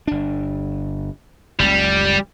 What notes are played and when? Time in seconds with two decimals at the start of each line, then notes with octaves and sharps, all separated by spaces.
0.08 G1 D4
1.59 F#1 C#2 G3